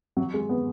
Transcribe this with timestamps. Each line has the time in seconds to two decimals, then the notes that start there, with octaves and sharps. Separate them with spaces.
0.17 F#3
0.34 G#3
0.49 B3